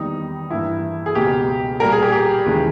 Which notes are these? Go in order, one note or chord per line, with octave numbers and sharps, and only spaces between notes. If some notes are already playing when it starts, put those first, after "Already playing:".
Already playing: E2 D#3 G3 A#3 D#4
G2 E3 A#3 E4
G#4
C#2 B2 A#3 G4
A#2 G3 A#3 A#4
G#4
G4
G4
D#2 C#3 E3 G#3